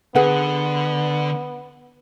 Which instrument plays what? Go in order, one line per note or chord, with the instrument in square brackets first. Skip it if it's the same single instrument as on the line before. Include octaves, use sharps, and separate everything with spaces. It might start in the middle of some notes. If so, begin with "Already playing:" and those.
[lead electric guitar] D3 [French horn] B3 [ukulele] G#4 B4 F#5